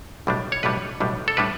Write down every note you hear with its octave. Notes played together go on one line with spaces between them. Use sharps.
B1 A2 G3 D4
C#5
B1 A2 G3 D4 B4
B1 A2 G3 D4
A4
A2 G3 D4 B4